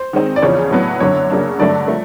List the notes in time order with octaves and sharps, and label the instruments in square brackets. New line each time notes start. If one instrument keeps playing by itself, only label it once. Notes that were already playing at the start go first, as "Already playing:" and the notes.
Already playing: [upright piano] C5
[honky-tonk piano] D#3 G#3 C4 D#4
[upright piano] D5
[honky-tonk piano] E2 C#3 F3 [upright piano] C#5
[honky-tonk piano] A2 F#3 B3
[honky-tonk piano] F#2 D3 F#3 [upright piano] C#5
[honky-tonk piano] C#3 F#3 A#3 D4
[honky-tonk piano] G2 D3 F#3 A3 [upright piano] D5
[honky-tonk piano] F3 A3